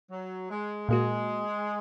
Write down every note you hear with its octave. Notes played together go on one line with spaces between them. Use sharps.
F#3
G#3
A#2 G#3 A#3 F#4